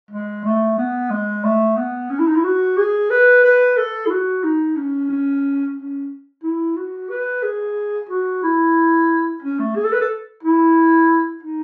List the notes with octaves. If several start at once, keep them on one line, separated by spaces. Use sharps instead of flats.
G#3
A3
B3
G#3
A3
B3
C#4
E4
D#4
E4
F#4
G#4
B4
B4
A4
E4
F#4
D#4
C#4
C#4
C#4
E4
F#4
B4
G#4
F#4
E4
C#4
A3
G#4
A4
B4
A4
E4
D#4